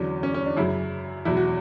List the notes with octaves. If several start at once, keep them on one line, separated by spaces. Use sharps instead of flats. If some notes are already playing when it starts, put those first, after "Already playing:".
Already playing: E2 D3 F#3 C#4
C#4
C#4
D4
F#2 C#3 F#3 E4
E2 B2 F#3 E4
F#4